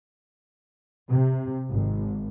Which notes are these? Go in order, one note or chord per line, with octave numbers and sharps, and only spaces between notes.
C3
G#1